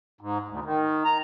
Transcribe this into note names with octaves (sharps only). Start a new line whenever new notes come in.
G#2
D2
D#3
A#5